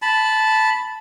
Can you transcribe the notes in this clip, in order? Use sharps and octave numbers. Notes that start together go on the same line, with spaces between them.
A5 B5